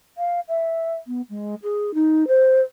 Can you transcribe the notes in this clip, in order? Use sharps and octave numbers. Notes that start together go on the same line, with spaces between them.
F5
E5
B3
G#3
G#4
D#4
C5